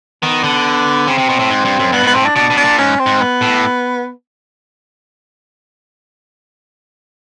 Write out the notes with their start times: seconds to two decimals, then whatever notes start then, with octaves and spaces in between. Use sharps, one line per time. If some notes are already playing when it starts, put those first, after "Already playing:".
0.22 D#3 B3
0.44 D3
1.07 C#3 C4
1.18 C3
1.29 B2
1.39 A2
1.50 G#2
1.65 G2
1.79 F#2
1.92 G2 B3
2.03 G#2 B3
2.15 A2 C4
2.25 D4
2.36 B2 D4
2.50 B2
2.57 D4
2.65 A#2
2.78 G#2 C#4
2.99 C4
3.06 G#2
3.21 B3
3.42 A2